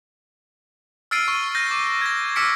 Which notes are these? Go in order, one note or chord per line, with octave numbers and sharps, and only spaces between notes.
E6 F6 A6 C7 D7 D#7
C#6 G7
F6 G6 A#6
D6
G#6 A#6
D6 E6 F6 B6 C#7 D7